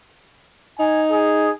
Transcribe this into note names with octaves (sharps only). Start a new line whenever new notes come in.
D#4 G#5
G#4